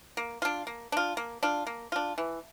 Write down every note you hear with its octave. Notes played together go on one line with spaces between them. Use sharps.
A#3
D4 F4
A#3
D4 F4
A#3
D4 F4
A#3
D4 F4
E3